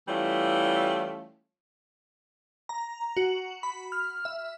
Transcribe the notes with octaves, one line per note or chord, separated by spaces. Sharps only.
E3 G3 A3 C#4 E4 F4
A#5
F#4
B5
F6
E5